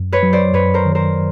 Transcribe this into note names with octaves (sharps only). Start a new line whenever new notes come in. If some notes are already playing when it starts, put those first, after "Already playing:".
Already playing: F#2
B4 C#5
F#3
C5 D5
F#2 B4 C#5
A#4 C5
D#3
A#4 C5